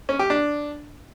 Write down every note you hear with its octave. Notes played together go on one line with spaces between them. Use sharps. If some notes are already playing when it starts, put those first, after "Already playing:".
C#4
G4
D4